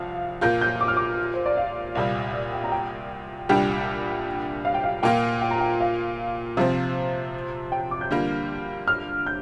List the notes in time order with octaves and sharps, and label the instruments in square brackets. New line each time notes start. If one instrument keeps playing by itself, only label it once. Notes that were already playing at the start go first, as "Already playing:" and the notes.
Already playing: [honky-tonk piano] C2 F3 [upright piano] F5
[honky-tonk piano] A#2 A#3 F4 [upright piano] G6
[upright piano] G6
D6
F6
D6
C5
D5
F5
[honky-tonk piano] C2 A#2 G3
[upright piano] D5
G5
A#5
G5
[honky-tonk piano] C2 A#2 G3 D4 G4 [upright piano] G5
[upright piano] F5
G5
F5
[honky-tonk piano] A#2 A#3 F4 [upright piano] G5
[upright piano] G5
A#5
G5
F5
[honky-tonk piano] C3 F3 C4 [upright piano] F5
[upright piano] G5
D6
G6
[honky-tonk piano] D3 G3 A#3 F4
[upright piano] F6
G6